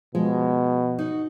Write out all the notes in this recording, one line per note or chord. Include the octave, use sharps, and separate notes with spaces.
B2 F3 G#3
D#4 F#4